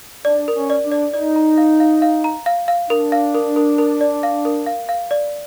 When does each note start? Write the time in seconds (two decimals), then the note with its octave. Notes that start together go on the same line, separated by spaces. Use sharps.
0.25 D4 D5
0.48 A#4
0.55 C#4
0.70 D5
0.84 D4
0.92 D5
1.13 D#4 D5
1.36 A#5
1.58 F5
1.80 F5
2.02 F5
2.24 A#5
2.46 F5
2.68 F5
2.90 D4 A#4
3.12 F5
3.35 A#4
3.56 A#4
3.78 A#4
4.01 D5
4.23 F5
4.45 A#4
4.66 F5
4.89 F5
5.11 D5